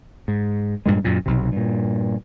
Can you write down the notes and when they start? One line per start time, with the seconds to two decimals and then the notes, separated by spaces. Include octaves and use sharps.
0.28 G#2
0.86 G2 A#2 G#3
1.04 F#2 A#2
1.26 B1 C3
1.52 G2 A#2